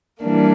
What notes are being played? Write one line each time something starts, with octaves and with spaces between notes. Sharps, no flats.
E3 G3 A#3 D4